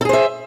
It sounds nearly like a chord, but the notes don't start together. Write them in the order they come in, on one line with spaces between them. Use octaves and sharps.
A4 G#4 C5 E5